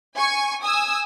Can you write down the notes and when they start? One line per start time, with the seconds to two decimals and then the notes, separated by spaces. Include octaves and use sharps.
0.16 G#5 C#6
0.63 G#5 D#6 E6